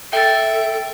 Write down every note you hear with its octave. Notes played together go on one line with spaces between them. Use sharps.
A4 E5 G5 A6